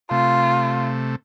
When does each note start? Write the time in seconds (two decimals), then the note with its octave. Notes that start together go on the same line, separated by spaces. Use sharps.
0.11 C3 A3 F4